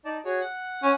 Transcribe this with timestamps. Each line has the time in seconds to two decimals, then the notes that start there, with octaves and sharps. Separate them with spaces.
0.05 D#4 D5 A5
0.25 F#4 G#4 C#5
0.41 F#5
0.83 C#4